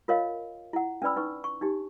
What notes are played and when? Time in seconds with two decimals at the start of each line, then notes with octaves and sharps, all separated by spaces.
0.08 F4 A#4 C#5 D#5 F5
0.73 E4 F#5
1.02 C#4 D4 B4 D5 B5 E6
1.16 D#4 B4 C#6
1.44 C#6
1.61 D4 D#4 G4